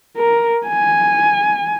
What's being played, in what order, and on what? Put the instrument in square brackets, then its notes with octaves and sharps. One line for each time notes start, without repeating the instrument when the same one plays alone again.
[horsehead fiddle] A#4
G#5